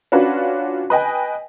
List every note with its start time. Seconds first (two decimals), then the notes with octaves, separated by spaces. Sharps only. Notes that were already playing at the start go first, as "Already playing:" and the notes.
0.12 C#4 D4 F4 F#4 B4
0.90 B4 D#5 G5 G#5